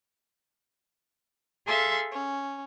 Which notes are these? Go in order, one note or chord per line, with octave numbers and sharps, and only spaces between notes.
G#4 A4 E5 F5 C6
C#4